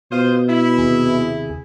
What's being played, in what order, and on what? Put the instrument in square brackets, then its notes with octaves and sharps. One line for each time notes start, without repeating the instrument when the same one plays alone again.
[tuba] B2 [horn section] F4 C5 [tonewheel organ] D#6 G6
[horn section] E4 [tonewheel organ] B5
[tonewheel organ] D#2 C3 G#4